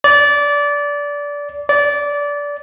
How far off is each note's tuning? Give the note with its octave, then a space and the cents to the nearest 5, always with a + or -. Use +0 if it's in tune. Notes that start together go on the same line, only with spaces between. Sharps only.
D5 -20
D5 -20